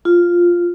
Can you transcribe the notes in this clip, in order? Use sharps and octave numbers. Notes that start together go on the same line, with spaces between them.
F4